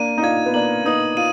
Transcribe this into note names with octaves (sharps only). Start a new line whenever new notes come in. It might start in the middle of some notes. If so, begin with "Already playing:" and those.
Already playing: A#3 D4 D#7
D#4
D4 F4 G#6
B3
A#3 D4 F#7
B3 D#4 D#6
F4 D#7